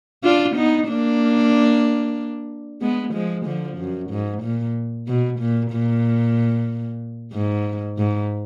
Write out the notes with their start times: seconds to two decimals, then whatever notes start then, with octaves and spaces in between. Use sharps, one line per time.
0.23 D4 F4
0.55 B3 D#4
0.88 A#3 D4
2.81 G#3 B3
3.14 F3 G#3
3.45 D3 F3
3.78 F#2
4.11 G#2
4.43 A#2
5.07 B2
5.39 A#2
5.72 A#2
7.32 G#2
7.98 G#2